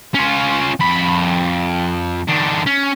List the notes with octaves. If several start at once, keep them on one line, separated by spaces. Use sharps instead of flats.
C#4 F4
F2 B5
D#3 D4
C#4